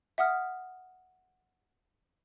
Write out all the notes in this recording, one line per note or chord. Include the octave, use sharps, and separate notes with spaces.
E5 F#5 D#6 F6